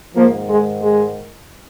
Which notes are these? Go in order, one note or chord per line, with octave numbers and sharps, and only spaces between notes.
G#2 D#3 F3 A#3
G#3
G#3